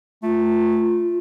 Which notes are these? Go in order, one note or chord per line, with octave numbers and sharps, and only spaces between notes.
A3 F4